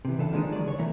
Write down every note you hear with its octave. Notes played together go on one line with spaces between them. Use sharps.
C3 E3
C#3 E3 D4 A4 F5
D#3 F3 G#3 A3 D4 D#4
D#3 F#3 D5
C#2 C#5
C2 B2 E3 A3 A#4 A#5